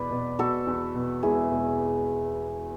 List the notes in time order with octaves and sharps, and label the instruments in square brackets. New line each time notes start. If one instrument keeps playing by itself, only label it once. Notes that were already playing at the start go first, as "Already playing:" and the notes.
Already playing: [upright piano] E2 B2 [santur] B4 D5
[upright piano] B2
[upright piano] B2 [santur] F#4 A4
[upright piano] E2
B2
[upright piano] E1 [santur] E4 G#4
[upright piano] E1